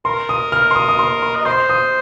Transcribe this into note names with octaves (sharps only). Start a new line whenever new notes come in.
A#4 C6
D#6
F6
C6
D#6
D#6
C6
C6
D#5
C5 C6
D#6